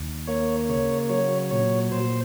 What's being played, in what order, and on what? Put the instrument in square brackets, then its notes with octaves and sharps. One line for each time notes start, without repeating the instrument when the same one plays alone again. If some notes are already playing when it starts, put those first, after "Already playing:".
Already playing: [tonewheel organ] D#2
A#3 C#5
C#3 C#5
F#3 C#5
A#2 C#5
A#2 C5